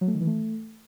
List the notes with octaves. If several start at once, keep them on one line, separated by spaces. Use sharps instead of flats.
F#3
A3
D#3
E3
A3